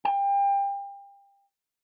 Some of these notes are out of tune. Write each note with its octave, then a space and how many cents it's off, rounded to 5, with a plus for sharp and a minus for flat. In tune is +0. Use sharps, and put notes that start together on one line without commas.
G5 +30